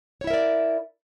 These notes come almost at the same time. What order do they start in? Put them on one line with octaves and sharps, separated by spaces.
C#5 E4 E5 A#4 D5